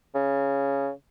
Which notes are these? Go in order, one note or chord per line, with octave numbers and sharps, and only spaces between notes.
C#3